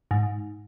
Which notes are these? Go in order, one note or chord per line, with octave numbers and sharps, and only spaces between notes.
G#2